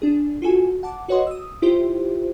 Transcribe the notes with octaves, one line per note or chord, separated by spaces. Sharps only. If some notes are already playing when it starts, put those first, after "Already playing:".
D4 G#4
F4 F#4 A4 G#5
F#5 A5 D6
F#4 B4 C#5 D#5 F#5 C6
D#6 E6
E4 F4 G4 C5 E5